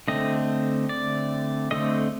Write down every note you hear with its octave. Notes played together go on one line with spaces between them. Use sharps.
D3 A3 C4 D#5
D5
D3 A3 C4 D#5